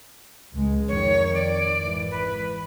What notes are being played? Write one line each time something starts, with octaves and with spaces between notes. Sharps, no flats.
C#2 G#3
F2 D#3 C#5
D5
G#1 E3
B4